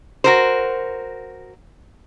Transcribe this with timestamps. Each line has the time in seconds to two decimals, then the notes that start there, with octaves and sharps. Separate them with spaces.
0.24 F#4 A#4 C5